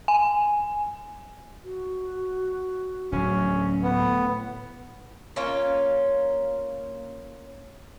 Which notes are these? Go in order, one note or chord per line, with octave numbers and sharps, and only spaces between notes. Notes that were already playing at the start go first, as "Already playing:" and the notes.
G#5
F#4
D1 F#3 C#4
A2 B3
A#3 C#4 F4 C#5